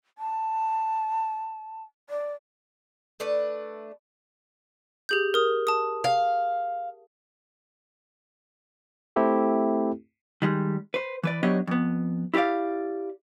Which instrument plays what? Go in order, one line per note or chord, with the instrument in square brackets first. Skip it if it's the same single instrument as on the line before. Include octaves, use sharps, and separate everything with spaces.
[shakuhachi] A5
D5
[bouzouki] A3 D4 B4
[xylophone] G4 G#4 G6
A#4 D#6
A5 D#6
[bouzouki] F5
[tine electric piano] A3 C4 E4 G4 A4
[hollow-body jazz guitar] D#3 G3 G#3
B4 C5
E3 B4 D5
F#3 B3 D4 G4 C#5 D#5
F2 B3
E4 G4 A#4 D5 F5